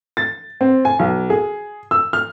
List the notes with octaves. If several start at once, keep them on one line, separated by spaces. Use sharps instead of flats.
A6
C4
G#5
B1
G#4
E6
F6